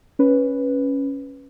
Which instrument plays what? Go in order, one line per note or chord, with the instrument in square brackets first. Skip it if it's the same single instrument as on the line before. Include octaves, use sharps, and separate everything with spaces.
[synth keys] C#4 B4